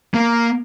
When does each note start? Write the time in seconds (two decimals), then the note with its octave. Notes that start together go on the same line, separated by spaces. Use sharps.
0.14 A#3